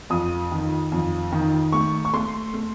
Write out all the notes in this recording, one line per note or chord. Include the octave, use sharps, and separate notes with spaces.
F2 D#6
D#3
F2
D#3
A3 C#6
C#6
A3 C6
A3